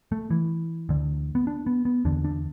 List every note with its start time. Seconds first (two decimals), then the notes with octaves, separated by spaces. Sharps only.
0.12 A3
0.30 E3
0.89 D2 D3
1.35 B3
1.47 D4
1.67 B3
1.85 B3
2.05 E2 D3 D4
2.24 D4